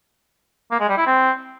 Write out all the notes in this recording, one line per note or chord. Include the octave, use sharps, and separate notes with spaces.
A#3
G#3
G3
E4
C4